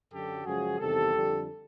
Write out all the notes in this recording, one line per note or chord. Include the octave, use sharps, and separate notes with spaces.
F#2 D3 F#3 G4 A4
F#2 C#3 F3 G#3 F#4 G#4
E2 C3 D#3 G3 G4 A4
F2 D3 G3